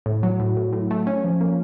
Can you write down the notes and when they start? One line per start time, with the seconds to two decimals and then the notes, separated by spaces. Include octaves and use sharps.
0.06 A2
0.23 F#3
0.40 A2
0.57 A2
0.73 A2
0.91 A3
1.07 C#4
1.24 F3
1.41 A#3